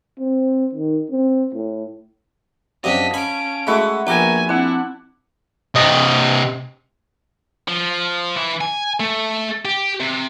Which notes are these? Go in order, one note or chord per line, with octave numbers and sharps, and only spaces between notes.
C4
D#3
C4
A2
F#2 C3 D4 D#5 F5 A5 B6
C#4 G#5 B5 D7
G#3 A3 E4 F#4 B5
A#1 A#3 B3 G4 A#4 G#5
C4 D4 E4 F#5
C3 D#5
F3
E3 E4
G#5
A3
G4
C3